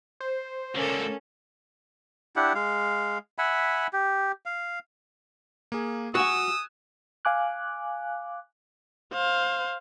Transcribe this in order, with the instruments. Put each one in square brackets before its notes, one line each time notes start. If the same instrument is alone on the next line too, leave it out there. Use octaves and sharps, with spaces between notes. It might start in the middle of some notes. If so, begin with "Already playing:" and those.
[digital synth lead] C5
[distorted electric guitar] C#2 D3 [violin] A#3 A4 [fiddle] C#4
[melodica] D4 E4 G4 F#5
G#3 F5
E5 F#5 G#5 B5
G4
F5
[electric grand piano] A#3 G#4
[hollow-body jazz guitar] F#4 F#5 [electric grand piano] G#5 F#6 [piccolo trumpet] D#6 [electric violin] E6
[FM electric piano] F5 G#5 D6 F#6
[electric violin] C5 F5